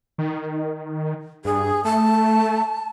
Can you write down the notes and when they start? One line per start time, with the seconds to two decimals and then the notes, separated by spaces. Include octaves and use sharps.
0.18 D#3
1.45 G2 G#4
1.84 A3 A5